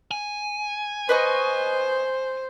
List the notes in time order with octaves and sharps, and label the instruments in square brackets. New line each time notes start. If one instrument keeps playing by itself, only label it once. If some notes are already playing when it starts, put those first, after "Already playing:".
[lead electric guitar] G#5
[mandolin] B4 D#5 C#6 [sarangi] C5